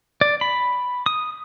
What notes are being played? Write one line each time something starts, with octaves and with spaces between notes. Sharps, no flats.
D5
B5
D#6